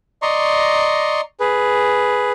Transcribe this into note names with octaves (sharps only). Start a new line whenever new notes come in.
D5 D#5 A#5 C6 C#6
G#4 B4